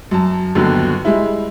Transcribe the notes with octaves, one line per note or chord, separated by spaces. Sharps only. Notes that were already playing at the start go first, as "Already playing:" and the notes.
F#2 A5
G1 D#2 B2 D3 F#3
G3 G#3 E4